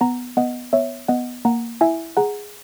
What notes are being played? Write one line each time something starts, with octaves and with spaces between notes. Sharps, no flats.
B3 F#5 A#5
B3 D#5 F#5
B3 C#5 E5
B3 D#5 F#5
A#3 F#5 A#5
E4 E5 G#5
G#4 F#5 A#5